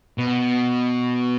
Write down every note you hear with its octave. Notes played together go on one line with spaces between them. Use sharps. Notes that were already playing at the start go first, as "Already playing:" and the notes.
B2